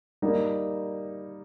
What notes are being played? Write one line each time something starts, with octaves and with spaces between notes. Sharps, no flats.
G3 A#3 D#4